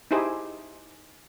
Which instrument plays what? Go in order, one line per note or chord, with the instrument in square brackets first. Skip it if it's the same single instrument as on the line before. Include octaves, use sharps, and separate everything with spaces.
[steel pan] D#4 E4 G4 G#4 C5